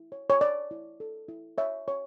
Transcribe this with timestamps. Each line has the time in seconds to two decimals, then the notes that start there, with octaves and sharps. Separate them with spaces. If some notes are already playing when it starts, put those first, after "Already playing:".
Already playing: E4
0.12 C#5
0.30 C#5
0.41 C#5 D5
0.71 E4
1.00 A4
1.28 E4
1.58 C#5 E5
1.88 C#5